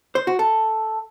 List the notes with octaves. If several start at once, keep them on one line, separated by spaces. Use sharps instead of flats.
C5
F#4
A4